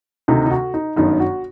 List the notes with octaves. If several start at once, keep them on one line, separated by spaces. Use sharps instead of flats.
D2 C3 D#3 D#4
D#4
F#4
D#4
G1 F#2 D#3 D#4
F#4